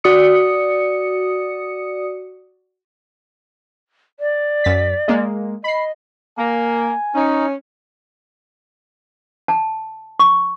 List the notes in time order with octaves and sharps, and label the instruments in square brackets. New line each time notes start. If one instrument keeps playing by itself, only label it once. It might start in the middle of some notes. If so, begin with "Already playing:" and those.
[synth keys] F#4 D5 D#6 C#7
[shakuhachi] D5
[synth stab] F#2 A6 B6
G#3 A#3
[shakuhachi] D#5 [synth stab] B5 C7
[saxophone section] A#3 [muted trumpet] G#5
[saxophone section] C#4 [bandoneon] D#4
[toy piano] A5
C#6